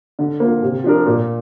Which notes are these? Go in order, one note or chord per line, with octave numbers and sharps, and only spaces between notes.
D3
A#3 F4
C3
F3 D4 A#4
A#2